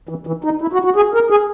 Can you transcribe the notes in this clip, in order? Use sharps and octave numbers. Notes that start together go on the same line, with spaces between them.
E3
E3
D#4
E4
F#4
F#4
G#4
A#4
G#4